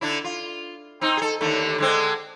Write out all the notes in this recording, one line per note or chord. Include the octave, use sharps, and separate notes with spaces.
D3 D4 E4
F4
C4 D#4
G#4 A4
D#2 D3 A3
D3 G#3 C4